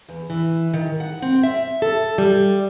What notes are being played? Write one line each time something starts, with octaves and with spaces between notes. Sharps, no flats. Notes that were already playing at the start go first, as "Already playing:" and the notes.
E2
E3
D#3
F#5
C4
E5
A4
G3